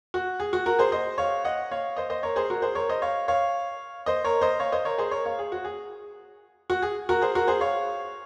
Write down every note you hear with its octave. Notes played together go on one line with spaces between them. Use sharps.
F#4
G#4
F#4
F#4 A#4
G#4 C5
C5 D#5
C#5 F5
D#5 F#5
C#5 F5
C5 D#5
C5 D#5
A#4 C#5
G#4 C5
F#4 A#4
G#4 C5
A#4 C#5
C5 D#5
C#5 F5
C#5 F5
C5 D#5
A#4 C#5
C5 D#5
C#5 F5
C5 D#5
A#4 C#5
G#4 C5
A#4 C#5
C#5 F5
G#4
F#4
G#4
F#4
G#4
F#4 A#4
G#4 C5
F#4 A#4
G#4 C5
C#5 F5